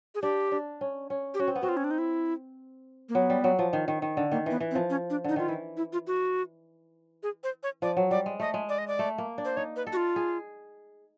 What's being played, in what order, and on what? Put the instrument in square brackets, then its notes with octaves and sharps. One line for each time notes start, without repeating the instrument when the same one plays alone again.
[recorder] G#4
[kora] D4 [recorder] G4
[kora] D4
C#4
C#4
[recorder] G4
[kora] C#4 [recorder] F#4
[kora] C4
B3
[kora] C4 [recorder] F#4
[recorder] F4
C#4
D4
D#4
E4
A#3
[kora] F#3 [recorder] B3
[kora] G3
F#3
F3
D#3
D#3
D#3
D3
[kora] D#3 [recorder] A#3
[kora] E3 [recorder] B3
[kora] E3
[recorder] C4
[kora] F3
[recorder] C#4
D4
[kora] D3 [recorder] D#4
[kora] D#3 [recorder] F4
[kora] E3 [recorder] E4
[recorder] E4
F4
F#4
G#4
C5
C#5
[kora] F3 [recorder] D5
[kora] F#3
[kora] G3 [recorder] D5
[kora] G#3
[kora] A3 [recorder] D#5
[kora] G#3
[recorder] D5
D#5
D5
[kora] A3
A#3
D4
[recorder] C5
[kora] D#4 [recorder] C#5
[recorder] B4
[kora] A4
[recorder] F#4
F4
[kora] G#4